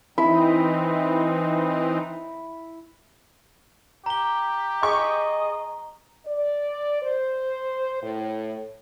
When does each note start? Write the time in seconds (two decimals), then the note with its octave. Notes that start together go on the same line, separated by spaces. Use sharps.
0.18 E3 C4 D#4 E4
4.06 G4 A#5 G7
4.83 G#4 D#5 C#6
6.26 D5
7.02 C5
8.02 A2